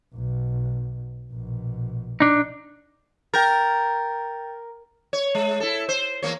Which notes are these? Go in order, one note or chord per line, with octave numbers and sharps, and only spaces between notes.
B1 B2
A#1 B2
D4 D#4
A#4 G5 G6 A6
C#5
G#3
E4 A4
C5
E2 A#3 C#5